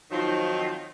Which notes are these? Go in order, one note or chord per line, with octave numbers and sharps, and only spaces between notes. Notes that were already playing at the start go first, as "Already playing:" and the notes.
D#3 F3 F#3 C4 D#4 F4